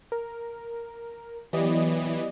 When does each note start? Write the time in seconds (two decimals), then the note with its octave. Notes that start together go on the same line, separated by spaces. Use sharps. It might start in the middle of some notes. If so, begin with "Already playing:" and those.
0.12 A#4
1.53 E3 F#3 B3 G4 D5 D#5